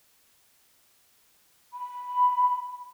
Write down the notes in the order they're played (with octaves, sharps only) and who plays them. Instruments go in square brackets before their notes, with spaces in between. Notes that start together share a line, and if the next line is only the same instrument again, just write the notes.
[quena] B5